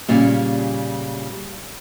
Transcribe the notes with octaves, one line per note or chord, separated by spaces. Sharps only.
A#2 C#3 G3